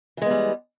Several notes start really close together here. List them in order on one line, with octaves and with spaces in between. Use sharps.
E3 G#3 B3 G3